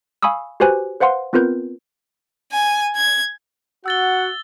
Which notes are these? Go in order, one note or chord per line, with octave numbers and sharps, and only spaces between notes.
F5 G#5 B5 C#6 D#6 E6
F#4 G4 B4 C5 G#5 F#6
B4 C5 F5 F#5 C6
B3 C4 F4 A#4 B4 G6
G#5
G#6
F#4 F#5 E6 A6 G7